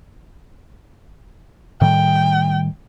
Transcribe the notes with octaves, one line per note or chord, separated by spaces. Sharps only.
A2 D#3 G3 G5